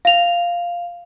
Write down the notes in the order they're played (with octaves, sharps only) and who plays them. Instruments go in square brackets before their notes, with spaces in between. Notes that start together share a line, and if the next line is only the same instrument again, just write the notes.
[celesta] F5 F7